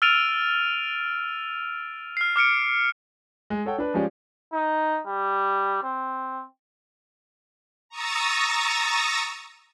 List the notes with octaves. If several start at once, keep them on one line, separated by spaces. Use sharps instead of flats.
E6 F6 A6 D7 D#7 F7
F6 C7
D6 F6 C#7 D7
G#3
A4 C#5 F#5 G5
D4 B4
F3 G#3 C#4 G4 D5
D#4
G3
C4
A#5 C#6 D#6 E6 A6 A#6